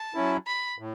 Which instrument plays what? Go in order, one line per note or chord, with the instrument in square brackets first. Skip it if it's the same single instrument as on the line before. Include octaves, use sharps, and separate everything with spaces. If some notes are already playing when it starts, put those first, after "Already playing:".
Already playing: [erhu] A5
[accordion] F#3 C#4 E4
[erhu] B5
[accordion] A2